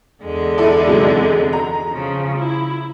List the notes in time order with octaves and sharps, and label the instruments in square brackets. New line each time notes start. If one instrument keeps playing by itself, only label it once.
[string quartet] E2 D3 G#3
[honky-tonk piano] E4 A4 D5
G#2 C3 F#3
A#5
[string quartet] C#3 F3
E4